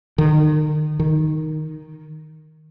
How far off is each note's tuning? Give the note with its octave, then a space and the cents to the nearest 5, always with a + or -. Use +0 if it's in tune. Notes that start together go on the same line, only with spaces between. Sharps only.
D#3 -35
D#3 -5